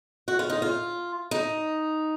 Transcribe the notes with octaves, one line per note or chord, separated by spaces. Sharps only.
F#4
F4
D#4
F4
D#4